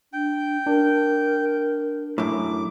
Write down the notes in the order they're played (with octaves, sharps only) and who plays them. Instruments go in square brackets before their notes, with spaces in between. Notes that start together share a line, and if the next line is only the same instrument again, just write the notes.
[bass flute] D4 [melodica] G5
[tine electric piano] D4 [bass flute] A#4
[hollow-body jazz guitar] F#2 A2 [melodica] D6